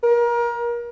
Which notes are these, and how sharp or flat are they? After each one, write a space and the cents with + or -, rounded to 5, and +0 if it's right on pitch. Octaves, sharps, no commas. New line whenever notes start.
A#4 +30